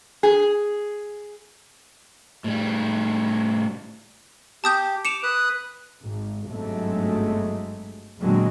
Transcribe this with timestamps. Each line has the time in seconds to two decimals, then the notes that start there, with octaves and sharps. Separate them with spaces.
0.23 G#4
2.44 A2 G3
4.64 G4 A5 D#6 G6
5.05 D6 C#7 E7 F7
5.23 B4 D#6 F#6
6.02 G#1
6.48 G1 G#2 C3 F#3 G#3 A3
8.19 E2 A#2 D3 F#3 G#3 C4